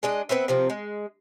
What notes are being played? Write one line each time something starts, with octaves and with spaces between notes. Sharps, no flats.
G#3 D4 D#5
B3 C4 B4 E5
C3 F3 C4
G#3